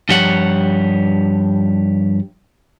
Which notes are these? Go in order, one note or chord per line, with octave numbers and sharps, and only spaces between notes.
G2 F3 G4 C#5 F#5